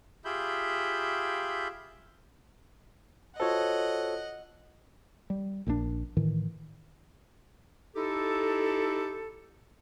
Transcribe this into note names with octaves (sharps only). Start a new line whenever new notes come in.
F4 G4 G#4 E5 B5 G6
F4 F#4 A4 C5 C#5 D#5 F#5
G3
A#1 A#2 D3 D4
A2 D#3 E3
D#4 E4 G4 A4